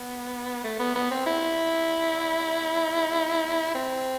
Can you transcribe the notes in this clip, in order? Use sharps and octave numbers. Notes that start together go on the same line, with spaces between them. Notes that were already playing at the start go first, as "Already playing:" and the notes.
Already playing: B3
A3
B3
B3
C4
E4
C4